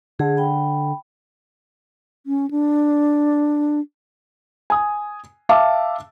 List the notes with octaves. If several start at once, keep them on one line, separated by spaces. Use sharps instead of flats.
D3 G#4
G5 B5
C#4
D4
G#5 D#6
E5 F5 A5 D6